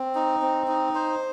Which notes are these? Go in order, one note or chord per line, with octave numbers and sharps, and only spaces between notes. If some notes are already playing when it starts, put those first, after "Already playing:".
Already playing: C4
D#4
C4
D#4
C5